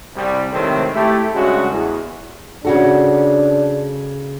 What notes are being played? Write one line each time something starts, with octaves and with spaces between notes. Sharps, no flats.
C2 G3
A2 C3 D#3 G#3 A3 C4
A3 E4 G4
G2 C#3 G#3 A3 F#4
E2
C#3 D4 F#4 A4